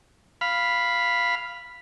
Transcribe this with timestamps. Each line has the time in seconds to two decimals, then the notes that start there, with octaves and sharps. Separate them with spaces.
0.41 F5 B5